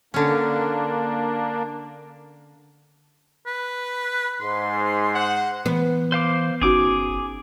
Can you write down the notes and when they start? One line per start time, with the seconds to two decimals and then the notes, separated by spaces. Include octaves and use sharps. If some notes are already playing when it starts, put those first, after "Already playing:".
0.14 D3 A#3 C#4 D4
3.47 B4
4.41 G#2 C6
5.14 C5 F#5
5.66 E3 B3
6.12 C5 F5 D6
6.62 G1 C#4 D#4 F#4 G#4 D6